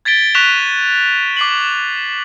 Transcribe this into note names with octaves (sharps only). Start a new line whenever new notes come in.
G#6 A6 B6 D7 G7
C#6 F#6 B6 E7 F7
D6 C7 F#7